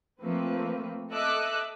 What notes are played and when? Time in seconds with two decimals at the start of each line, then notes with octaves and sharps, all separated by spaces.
0.21 F3 A3 A#3 C4 B4
1.11 A4 D#5 E5 D6 E6 F#6